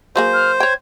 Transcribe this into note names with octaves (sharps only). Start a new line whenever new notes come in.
F#3 A#3 G#4 C5
F6
C#5 G5 G#6